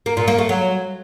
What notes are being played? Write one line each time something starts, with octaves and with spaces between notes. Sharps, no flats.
A#3
A#2
A#3
A3
F#3